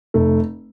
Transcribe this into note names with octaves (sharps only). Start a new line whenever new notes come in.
F1 A3